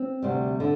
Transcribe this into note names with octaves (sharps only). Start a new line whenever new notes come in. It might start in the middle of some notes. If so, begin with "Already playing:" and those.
Already playing: C4
D2 C3 G3
D3